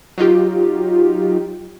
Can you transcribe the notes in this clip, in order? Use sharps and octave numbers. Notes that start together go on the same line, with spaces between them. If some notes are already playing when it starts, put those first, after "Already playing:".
F#3 D#4 F4 G4